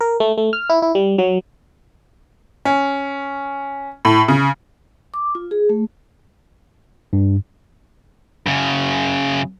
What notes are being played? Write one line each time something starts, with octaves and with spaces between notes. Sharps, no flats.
A#4
A3
A3
F6
E4
E4
G3
F#3
C#4
A2
C#3
D6
F4
G#4
A3
G2
F#2 C#3